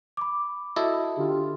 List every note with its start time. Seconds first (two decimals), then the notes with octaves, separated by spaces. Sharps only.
0.17 B5 D6
0.76 E4 F#4 A4 D#5
1.17 D3 F4 G4